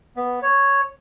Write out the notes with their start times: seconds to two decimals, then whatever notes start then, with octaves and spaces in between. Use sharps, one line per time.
0.16 B3
0.42 C#5